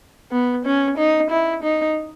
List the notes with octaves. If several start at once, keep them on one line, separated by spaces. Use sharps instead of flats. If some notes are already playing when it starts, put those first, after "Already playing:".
B3
C#4
D#4
E4
D#4